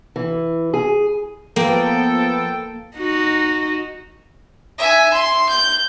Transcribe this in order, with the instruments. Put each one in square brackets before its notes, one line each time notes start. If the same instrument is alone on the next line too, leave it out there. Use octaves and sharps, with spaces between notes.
[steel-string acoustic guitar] E3
G#4
[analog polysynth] F3 B3 [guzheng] A#3 [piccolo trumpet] A4 [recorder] G5
[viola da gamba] D#4 F#4
[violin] E5 G#5
C6
G6